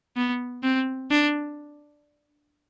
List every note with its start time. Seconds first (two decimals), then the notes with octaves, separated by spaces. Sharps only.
0.17 B3
0.63 C4
1.11 D4